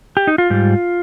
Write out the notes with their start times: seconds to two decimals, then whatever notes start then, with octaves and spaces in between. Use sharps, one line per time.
0.17 G4
0.27 D#4
0.38 F4
0.50 G#2 G3